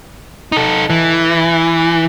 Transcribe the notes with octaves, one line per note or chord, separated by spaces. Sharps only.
D#4 A4
E3